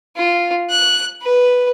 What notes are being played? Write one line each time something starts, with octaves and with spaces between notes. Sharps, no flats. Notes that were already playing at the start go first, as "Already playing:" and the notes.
F4
F#6
B4